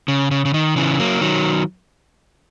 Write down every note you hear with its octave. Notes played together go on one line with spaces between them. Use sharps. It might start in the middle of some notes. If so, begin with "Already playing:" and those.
C#3
C#3
C#3
D#3
C#3 E3
F#3 A#3
D#3 F#3